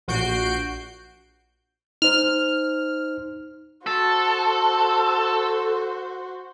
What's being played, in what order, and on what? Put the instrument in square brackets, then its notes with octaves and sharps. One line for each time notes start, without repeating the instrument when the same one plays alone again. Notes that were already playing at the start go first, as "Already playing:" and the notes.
[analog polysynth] A#1 F#4 G6 C7 D7
[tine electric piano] D#4 C5 [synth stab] F6
[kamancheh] F#4 C5 [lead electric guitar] A4